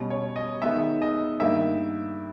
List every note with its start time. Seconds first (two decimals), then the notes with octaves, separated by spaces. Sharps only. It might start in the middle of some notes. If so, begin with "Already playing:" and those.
Already playing: B2 G3 C#4
0.10 C#5
0.36 D#5
0.62 D#3 G#3 B3 D#4 E5
1.02 D#5
1.40 G2 D#3 A#3 E5